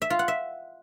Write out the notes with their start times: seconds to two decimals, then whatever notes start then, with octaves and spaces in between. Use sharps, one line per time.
0.02 E5
0.10 F4
0.19 F#5
0.28 E5